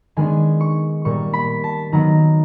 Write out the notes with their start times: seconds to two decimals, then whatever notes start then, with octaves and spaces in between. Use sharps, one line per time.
0.17 D#3 G#3 B3 D4 G#5
0.61 C#6
1.05 A#2 G3 A#3 C#6
1.33 B5
1.64 A5
1.92 D#3 F#3 B3 A#5